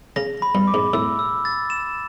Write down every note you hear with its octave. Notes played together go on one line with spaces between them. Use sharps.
C#3 A#6
B5
G2
D6
G#2
A2 E6
E6
A6
E7